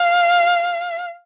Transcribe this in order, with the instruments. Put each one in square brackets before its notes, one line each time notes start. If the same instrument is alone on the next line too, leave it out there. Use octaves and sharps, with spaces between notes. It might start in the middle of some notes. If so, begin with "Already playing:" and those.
Already playing: [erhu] F5